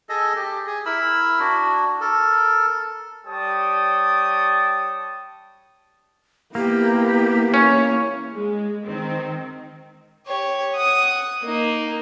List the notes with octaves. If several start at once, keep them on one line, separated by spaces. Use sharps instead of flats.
G#4 A4 D#5
G4
G#4
E4 A#4 B5 E6
D4 F#4
A4 A#4
G3 G4 C#5 G5 A5 D#6
A#3 B3 E4 G4
C#4 E4 C#5
G#3
D#3 C4
G4 C#5
F#5 D#6
A#3 D#4